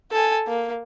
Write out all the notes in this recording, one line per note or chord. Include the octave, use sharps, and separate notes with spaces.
A4 G#5
A#3